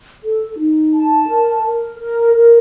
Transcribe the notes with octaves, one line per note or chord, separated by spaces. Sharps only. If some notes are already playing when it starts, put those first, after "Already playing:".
A4
D#4
A5
A#4
A#4
A#4
A#4